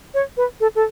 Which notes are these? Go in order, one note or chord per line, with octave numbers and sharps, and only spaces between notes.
C#5
B4
A4
A4